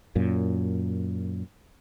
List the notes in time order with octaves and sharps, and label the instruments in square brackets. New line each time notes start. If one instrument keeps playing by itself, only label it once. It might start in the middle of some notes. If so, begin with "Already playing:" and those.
[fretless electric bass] F#2 A#2